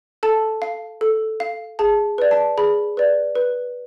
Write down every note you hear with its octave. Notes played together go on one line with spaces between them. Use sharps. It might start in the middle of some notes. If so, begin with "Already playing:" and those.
A4 A5
F5
A4
F5
G#4 A5
B4 D5
A5
G#4 B5
B4 D5
B4